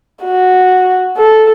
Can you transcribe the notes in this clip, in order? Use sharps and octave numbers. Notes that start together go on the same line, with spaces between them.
F#4
A4